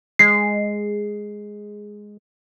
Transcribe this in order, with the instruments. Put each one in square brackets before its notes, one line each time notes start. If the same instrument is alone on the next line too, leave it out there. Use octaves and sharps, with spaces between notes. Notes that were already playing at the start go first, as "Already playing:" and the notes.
[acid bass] G#3 [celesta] C7